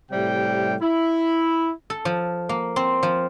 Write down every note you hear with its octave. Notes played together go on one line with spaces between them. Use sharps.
A2 C3 G3 G5
E4
A4
F3
A#3
C4
F3